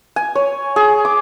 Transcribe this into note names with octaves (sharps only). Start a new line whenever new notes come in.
G#5
C#5
G#4
D6